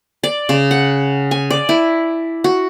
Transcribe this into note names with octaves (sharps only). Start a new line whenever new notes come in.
D5
C#3
F#5
G#5
D5
E4
F#4